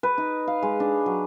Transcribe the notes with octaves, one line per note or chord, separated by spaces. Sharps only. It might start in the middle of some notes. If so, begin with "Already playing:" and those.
B4
D#4
F5
G#3
D4
F#3